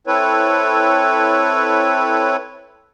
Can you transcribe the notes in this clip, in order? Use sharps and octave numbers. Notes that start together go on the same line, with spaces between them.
C4 E4 A4 B4 C#5